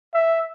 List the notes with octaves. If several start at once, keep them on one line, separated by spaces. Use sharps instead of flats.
E5